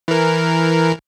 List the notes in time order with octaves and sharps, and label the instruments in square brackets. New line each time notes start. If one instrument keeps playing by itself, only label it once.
[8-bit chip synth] E3 A#4